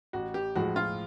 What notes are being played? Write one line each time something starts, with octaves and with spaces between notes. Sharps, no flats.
A1 F#4
G4
A2 F3 G#3 F#4
F4